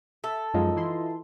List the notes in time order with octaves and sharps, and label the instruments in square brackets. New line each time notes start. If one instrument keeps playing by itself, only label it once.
[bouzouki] A4 [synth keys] E5
[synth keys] F#2 F3 G#3 [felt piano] D#4 F4 D#5
[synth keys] E3 E4 C6